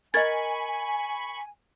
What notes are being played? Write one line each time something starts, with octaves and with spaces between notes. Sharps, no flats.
A#4 D#5 G#5 B5 C#6 G#6 A6